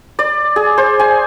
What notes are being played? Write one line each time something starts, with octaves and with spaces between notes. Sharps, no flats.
D5
G#4
C5
G#5